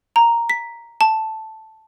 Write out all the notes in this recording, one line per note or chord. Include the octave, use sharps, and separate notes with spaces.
A#5
B6
A5